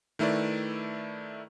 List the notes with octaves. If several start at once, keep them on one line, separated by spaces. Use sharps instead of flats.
D#3 A3 E4 B4 D5